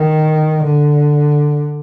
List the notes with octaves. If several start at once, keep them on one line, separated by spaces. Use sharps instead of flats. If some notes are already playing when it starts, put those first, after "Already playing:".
Already playing: D#3
D3